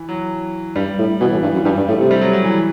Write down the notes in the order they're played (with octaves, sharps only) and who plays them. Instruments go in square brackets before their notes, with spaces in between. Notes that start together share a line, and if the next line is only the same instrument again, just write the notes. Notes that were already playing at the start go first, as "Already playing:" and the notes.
Already playing: [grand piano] E3
F#3
[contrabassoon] G2 [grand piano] G3
[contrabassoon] A2
[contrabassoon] B2 [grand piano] E3
[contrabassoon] A2
G2
F#2
[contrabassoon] G2 [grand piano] G3
[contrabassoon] G2
[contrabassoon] A2 [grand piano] A3
[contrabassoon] C3
[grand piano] G3
F#3
F#3
E3